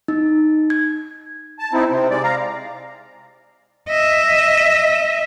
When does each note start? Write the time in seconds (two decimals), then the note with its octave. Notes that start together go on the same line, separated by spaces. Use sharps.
0.08 D#4
0.70 G#6
1.59 A5
1.73 C4 D#4 E4
1.91 C3 C4
2.10 G#3 D5
2.24 F5 A#5
3.89 D#5 E5